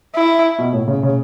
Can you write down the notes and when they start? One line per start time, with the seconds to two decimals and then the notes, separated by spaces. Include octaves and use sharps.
0.15 E4
0.59 B2
0.73 A2
0.87 C#3
1.03 C#3